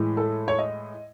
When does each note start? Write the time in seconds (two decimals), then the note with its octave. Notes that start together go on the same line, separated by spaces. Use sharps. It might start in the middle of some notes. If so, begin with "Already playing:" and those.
Already playing: A2 E3 G#3
0.17 A4
0.48 C#5
0.59 D#5